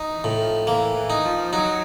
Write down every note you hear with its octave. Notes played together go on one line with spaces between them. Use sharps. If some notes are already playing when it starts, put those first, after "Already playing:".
Already playing: D#4
E3
A2
F3
E3 A#3
E3
D#4
F3
F#3 D#4